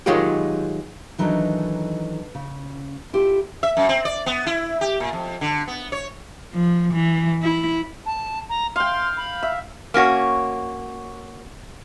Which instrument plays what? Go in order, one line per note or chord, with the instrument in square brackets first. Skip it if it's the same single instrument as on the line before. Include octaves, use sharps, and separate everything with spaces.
[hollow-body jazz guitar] D#3 F#3 G#3 F4 G4
[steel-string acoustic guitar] D#3 E3 F#3 D4 D#4 A4
C#3
E4 F4 G4 A4
[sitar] E5
F#2
C4
D5
B3
E4
G4
A#2
F2
D3
B3
C#5
[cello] F3
E3
E4
[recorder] A5
A#5
[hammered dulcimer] F5 G5 [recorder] C6
[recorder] B5
[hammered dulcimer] E5
[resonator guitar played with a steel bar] A#3 C#4 F#4 C#5